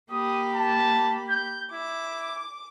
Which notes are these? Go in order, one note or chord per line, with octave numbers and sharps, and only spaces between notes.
A#3 G4 B5 D#6
A5
G6
E4 D6